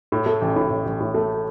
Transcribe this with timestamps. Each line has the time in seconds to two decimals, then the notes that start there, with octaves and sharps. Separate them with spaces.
0.12 A2
0.26 A3
0.42 A1
0.56 A2
0.70 A1
0.85 A1
1.00 A2
1.14 A3